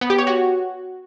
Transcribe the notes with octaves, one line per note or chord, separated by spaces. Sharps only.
B3
G4
C#5
F#4